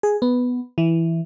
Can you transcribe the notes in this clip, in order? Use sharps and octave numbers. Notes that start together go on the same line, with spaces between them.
G#4
B3
E3